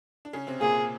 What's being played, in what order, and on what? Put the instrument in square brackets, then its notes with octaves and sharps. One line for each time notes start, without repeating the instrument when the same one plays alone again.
[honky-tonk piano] D4
C#3 C#4
C3 C4
[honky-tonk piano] A#2 A#3 [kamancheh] G#4